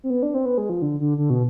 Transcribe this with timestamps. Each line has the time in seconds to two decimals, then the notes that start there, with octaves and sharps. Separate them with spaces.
0.04 C4
0.10 B3
0.23 D4
0.34 C4
0.45 B3
0.58 G#3
0.69 F3
0.82 D3
1.00 D3
1.18 D3
1.30 B2